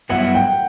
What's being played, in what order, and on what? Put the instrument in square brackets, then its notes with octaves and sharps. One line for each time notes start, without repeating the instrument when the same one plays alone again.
[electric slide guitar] G2 F#3 B3 E4 [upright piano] F#5
[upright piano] G5